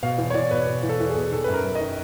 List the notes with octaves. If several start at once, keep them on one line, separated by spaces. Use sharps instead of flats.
B2 F5
E2
C#5
E2 D5
B2 B4
B2
E2
A4
E2
G#4
B2
D#3 A4
F#2 B4
A#4
F#2
D#5
D#3